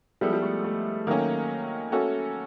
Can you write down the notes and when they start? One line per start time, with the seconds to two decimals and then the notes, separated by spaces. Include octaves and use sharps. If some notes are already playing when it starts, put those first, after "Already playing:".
0.21 F3 G3 G#3 B3 E4 A4
0.33 G3
0.42 A3
0.64 A3
1.07 D#3 F#3 A3 A#3 C#4
1.92 A3 C#4 F#4 A4